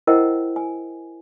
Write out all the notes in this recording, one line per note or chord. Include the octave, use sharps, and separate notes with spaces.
E4 A#4 C5 D#5 F#5 G5
G#5